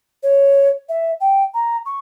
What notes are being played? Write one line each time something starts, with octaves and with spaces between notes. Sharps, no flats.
C#5
E5
G5
A#5
C#6